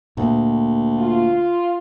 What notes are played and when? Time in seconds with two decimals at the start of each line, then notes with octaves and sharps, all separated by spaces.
0.17 D2 A#2 A#3
0.98 F4